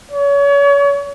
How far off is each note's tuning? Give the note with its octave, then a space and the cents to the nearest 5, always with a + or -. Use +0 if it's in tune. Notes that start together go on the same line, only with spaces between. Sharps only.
C#5 +35